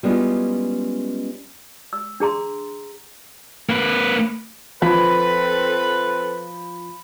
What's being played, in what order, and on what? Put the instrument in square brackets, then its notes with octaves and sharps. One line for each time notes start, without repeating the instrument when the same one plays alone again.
[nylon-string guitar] G3 G#3 B3 C#4 E4 F4
[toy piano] E6
D4 G#4 A#5 C6
[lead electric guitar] A#3 B4
[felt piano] F3 [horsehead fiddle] C4 A4 [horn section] B4 [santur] B5